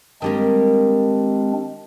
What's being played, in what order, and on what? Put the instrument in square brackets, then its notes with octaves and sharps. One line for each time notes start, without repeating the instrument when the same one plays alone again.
[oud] D#3 G3 A#3 [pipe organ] G#3 C4 D4